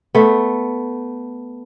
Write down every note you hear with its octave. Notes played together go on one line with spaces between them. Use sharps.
A3 B3